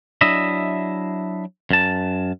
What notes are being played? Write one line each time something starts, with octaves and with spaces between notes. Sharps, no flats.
F#3 D4 E4 D#5 E5
F#2 A5